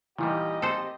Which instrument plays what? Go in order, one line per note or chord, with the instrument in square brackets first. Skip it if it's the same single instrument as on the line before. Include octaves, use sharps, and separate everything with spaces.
[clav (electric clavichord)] A#2 D#3 G3 [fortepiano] E3 [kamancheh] G4 D#5
[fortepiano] C4 [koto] A4 C5